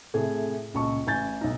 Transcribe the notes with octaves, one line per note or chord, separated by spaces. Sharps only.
A2 C3 G#4 A4
C#2 A#2 A5 C#6
A1 G#5 G6 A6
B1 D#4